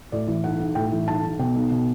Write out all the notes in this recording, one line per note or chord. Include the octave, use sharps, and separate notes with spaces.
A2 D5
E3
B1 F#5
B1
A2 G5
E3
B1 A5
B1
B2 G5
B1
B2